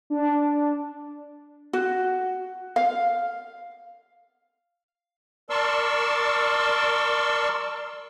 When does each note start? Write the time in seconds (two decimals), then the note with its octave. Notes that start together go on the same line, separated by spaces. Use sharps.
0.10 D4
1.73 F#4
2.76 F5
5.50 A#4 D5 A5 C6 C#6 E6